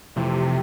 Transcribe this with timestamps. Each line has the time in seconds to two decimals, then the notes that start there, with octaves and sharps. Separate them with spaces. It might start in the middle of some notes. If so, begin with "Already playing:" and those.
0.16 F2 C3 E3 A3